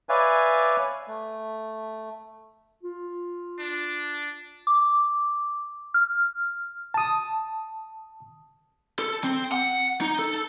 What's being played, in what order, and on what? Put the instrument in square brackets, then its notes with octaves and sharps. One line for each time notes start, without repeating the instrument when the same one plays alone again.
[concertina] B4 C#5 D5 E5 F5 G#5
A3
[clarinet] F4
[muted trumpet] D4
[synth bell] D6
F6
[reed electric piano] A5 D#6
[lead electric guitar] A4
C4
F#5
D#4
A4